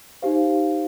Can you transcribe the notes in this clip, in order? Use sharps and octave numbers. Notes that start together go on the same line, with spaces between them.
D#4 G4 C5 F5